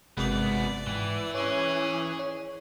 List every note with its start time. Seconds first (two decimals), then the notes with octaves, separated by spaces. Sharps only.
0.17 G1 F#2 C3 G#3 B3 D5
0.87 G#2 E3
1.35 C#4 G#4 C#5
2.19 C#5